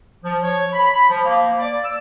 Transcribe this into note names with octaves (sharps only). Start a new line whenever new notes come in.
F3
C#5
B5
B5
F3
A#3
D5
E6